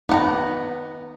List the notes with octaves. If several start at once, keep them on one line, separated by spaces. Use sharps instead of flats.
B3 D#4 F#5 A#5